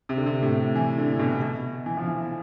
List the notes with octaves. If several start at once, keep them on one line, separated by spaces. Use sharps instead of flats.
C3
D3
C3
A2
E3
D3
A2
B2
B2
E3
F3
E3